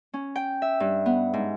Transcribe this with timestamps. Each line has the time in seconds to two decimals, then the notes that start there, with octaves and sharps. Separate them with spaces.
0.13 C#4
0.36 G5
0.62 E5
0.80 G2
1.06 B3
1.33 G#2